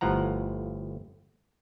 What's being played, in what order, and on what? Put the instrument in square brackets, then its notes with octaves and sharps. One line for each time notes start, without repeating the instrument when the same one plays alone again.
[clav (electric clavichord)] G1 A2 F3 F#5 A#5